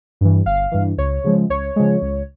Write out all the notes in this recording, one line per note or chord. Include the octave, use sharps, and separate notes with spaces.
G2 E3
G1 F5
G2 E3
C#2 C#5
C#3 F3 G#3
C#2 C#5
C#3 F3 G#3
C#2